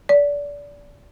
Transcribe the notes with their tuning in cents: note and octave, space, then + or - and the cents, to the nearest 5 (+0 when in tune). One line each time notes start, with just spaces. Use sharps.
D5 -25